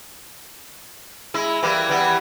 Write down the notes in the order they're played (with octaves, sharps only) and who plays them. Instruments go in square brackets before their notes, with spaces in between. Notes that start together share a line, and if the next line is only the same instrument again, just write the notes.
[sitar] G#3 E4
E3 G3 A#3
E3 G3 B3